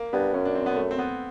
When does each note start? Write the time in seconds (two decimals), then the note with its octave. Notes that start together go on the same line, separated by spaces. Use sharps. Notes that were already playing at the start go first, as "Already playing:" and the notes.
Already playing: A#3
0.13 G2 B3
0.34 F#2 C#4
0.45 D4
0.55 C4
0.66 B3
0.76 A3
0.91 C4
0.99 B3